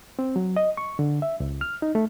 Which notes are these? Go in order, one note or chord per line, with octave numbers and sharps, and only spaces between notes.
C4
F#3
D#5
C#6
D3
E5
C#2
F6
D#4
A3